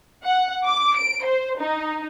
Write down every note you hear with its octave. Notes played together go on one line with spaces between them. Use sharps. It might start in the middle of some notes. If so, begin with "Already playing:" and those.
F#5
D6
D7
C5
D#4